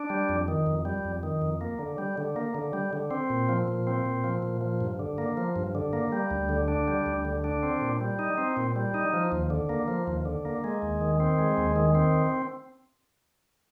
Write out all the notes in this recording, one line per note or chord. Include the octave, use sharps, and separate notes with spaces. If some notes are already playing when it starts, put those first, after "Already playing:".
Already playing: D4
G3
F2
D#3
F2
G3
F2
D#3
F2
A#3
D3
G3
D3
A#3
D3
G3
D3
C4
A#2
F3
A#2
C4
A#2
F3
A#2
F3
G2
D3
A#3
F3
G2
D3
A#3
G3
D2
D3
D4
G3
D2
D3
D4
C4
A#2
G3
D#4
C4
A#2
G3
D#4
F3
D#2
D3
A#3
F3
D#2
D3
A#3
G#3
D#2
D#3
C4
G#3
D#2
D#3
C4